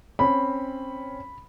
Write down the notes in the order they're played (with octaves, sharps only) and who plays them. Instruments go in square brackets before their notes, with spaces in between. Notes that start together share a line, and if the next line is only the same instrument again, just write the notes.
[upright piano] C4 C#4 [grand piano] B5